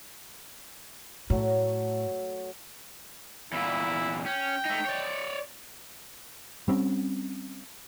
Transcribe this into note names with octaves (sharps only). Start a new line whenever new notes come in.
A2 F#3 A3
E2 A#2 E4
C#4 G5
A3 D#4
C#5 D5
G3 C4 C#4